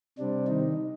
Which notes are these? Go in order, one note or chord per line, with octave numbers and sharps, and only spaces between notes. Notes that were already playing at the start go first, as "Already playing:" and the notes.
C3 G3 C4 D4
D#3 D#4